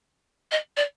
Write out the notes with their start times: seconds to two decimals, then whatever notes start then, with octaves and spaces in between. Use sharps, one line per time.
0.51 D#5
0.77 D5